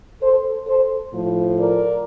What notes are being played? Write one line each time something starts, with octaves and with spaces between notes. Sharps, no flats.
A4 C5
A4 C5
A2 F3
A#4 D5